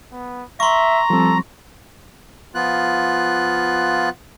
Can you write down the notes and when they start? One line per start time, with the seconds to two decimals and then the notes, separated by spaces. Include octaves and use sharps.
0.12 B3
0.60 E5 A#5 C6 C#6
1.10 F3 G3 C4 A4
2.55 F3 B3 F4 F#6